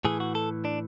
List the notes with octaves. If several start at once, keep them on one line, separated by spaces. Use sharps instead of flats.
A2 E3 G#4
F#4
A4
D4